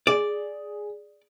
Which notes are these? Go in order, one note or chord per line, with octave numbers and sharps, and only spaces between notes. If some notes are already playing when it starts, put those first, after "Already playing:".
G#4 D5